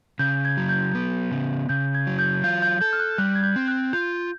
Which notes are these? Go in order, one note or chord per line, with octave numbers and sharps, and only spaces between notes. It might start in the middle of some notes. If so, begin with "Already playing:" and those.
C#3 G6
G#6
F#3
G6
B3
C#3
C#3 G6
G#6
F#3
G6
F4 G6
G6
A4 G6
F6
F#6
G3 F#6
G#6
G6
C4
F#6
F4 G6